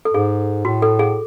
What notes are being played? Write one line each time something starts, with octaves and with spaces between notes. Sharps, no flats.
A4
G#2 G#4
A2 F#4
A4
G#4